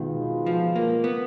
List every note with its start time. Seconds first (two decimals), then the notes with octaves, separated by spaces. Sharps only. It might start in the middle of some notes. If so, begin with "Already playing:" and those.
Already playing: B2 D#3 G#3 B3 F4
0.46 F3
0.76 A#3
1.04 B3